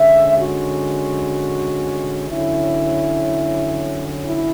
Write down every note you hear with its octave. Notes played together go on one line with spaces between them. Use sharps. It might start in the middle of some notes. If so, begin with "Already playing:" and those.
Already playing: D3 G#3 C#4 E5
F#4
D3 F#3 C#4 E4
E4